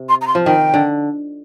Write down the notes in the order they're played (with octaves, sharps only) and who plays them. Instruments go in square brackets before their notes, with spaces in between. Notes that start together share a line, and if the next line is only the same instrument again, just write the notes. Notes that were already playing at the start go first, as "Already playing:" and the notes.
Already playing: [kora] C3
[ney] C6
A#5
C6
[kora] F3
[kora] D#3 [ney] G5
[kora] D3